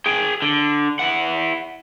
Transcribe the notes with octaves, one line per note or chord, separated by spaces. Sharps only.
G#4 G5
D3
E4 F#5